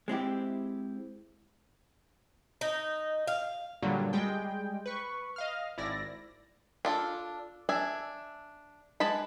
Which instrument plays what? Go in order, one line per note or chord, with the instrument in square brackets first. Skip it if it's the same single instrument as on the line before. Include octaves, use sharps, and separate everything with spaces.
[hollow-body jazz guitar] G#3 C4 E4 G4
[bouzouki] D#4
F5
[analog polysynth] G2 A#2 D3 F#3 G3
G3 G#3 G5
B4 C#6
D#5 F5 F6
G#1 E4 D5 A#6
[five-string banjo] D4 F4 A4
D4 E5 G#5
G#3 B4 A5 B5